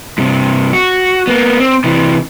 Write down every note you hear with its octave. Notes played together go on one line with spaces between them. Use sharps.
G2 C3
F#4
A#3 B3
C4
C3 E3